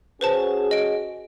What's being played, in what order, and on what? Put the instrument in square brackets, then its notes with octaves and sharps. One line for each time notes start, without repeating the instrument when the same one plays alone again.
[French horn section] C#4 F#4 G#4 [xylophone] B4 C5 A5
[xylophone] D#5 D7